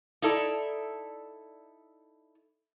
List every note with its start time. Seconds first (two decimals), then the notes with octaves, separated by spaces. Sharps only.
0.22 D#4 E4 A4 D5